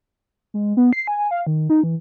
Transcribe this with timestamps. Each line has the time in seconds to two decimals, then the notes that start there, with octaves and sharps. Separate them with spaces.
0.54 G#3
0.77 B3
0.93 C7
1.07 G#5
1.31 F5
1.47 D#3
1.70 D#4
1.83 E3